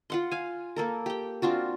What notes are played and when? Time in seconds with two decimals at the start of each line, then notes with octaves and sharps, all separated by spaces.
0.10 F4 F#5 C6
0.31 F5 G#5
0.76 A#3 A4 A#4
1.06 G4 G5
1.42 C4 D4 F4 F#4